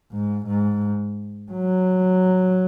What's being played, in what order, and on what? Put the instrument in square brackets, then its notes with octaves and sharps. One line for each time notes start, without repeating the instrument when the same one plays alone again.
[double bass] G#2
G#2
F#3